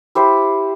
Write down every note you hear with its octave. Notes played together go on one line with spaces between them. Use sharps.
E4 G4 C5